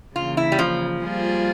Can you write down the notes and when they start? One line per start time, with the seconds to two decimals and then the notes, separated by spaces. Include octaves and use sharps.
0.15 C#3 E3 A#3 F4
0.37 E4
0.52 G3
0.59 F3
1.02 G3 A#3 F4 G#4 C5